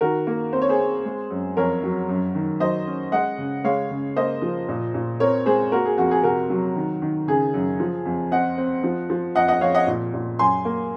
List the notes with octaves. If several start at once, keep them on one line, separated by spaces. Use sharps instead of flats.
D#3 F#4 A#4
A#3
C4 C5
C#5
G#4 C5
C4
G#3
F#2
F2 A#4 C#5
F#3
F#2
D#3
F#3 C5 D#5
C#4
G#3 D#5 F#5
C#3
G#3 C#5 F5
C#3
A#3 C5 D#5
F3
A#2
A#2
C4 A#4 C#5
G#3 G#4 C5
A#3 F#4 A#4
G#4
F2 F#4
G#4
C3 F#4 A#4
F#3
D#3
D#3
C#3 G#4
F#2
F3
F2
C4 D#5 F#5
C4
F3
F3
F2 D#5 F#5
D#5 F#5
F2 C#5 F5
D#5 F#5
A#2
A#2
F#2 G#5 C6
A#3